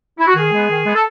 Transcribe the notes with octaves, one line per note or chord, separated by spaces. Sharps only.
E4
F#4
D#3 G#4
G#3 B3
D#3
G#3 B3
A4